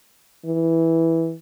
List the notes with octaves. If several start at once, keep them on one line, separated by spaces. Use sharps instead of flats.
E3